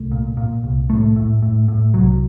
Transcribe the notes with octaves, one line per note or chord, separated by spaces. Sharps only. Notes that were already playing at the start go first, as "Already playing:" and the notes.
Already playing: C2 A3
A#2
A#2
C2
A2 A3
A2
A2
A2
C2 F#3